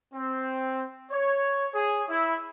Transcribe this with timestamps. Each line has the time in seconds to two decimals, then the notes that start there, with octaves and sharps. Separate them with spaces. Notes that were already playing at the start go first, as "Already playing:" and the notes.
0.14 C4
1.12 C#5
1.74 G#4
2.09 E4